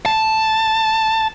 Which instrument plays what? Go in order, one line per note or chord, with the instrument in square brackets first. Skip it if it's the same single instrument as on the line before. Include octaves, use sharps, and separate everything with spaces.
[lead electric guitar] A5